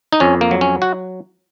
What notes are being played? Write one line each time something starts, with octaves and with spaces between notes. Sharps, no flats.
D#4
F2 C#4
A#3
F#3
C#4
F#4